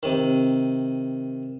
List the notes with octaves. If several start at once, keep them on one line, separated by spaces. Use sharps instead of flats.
C3 D#3